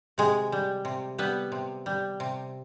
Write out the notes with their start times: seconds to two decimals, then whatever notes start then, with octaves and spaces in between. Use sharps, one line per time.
0.18 C3 G#3 G#4
0.52 G3
0.85 C3
1.18 G3 B3 B4
1.52 C3
1.86 G3
2.20 C3